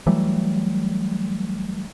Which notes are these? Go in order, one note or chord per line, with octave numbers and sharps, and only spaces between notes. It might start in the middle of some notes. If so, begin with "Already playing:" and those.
E3 F#3 G3 A3